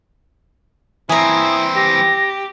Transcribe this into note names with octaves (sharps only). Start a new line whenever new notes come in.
E3 C4 E4 G#5 A#5 D#6
G4 A#6